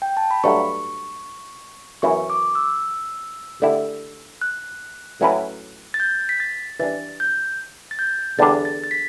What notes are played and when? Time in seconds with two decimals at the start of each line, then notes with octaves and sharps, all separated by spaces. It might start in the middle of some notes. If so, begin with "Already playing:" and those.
0.02 G5
0.17 A5
0.31 B5
0.44 G2 F#3 A3 C#6
2.02 F#2 E3 B3 E4 C#6
2.30 D6
2.55 E6
3.62 D3 A3 E4 G4
4.42 F#6
5.21 A2 F#3 C#4 E4 B4
5.94 A6
6.00 G6
6.29 B6
6.40 A6
6.80 E3 G3 D4 A6
7.20 G6
7.91 A6
7.99 G6
8.39 E2 D3 G3 D4 A6
8.65 A6
8.84 A6
8.91 B6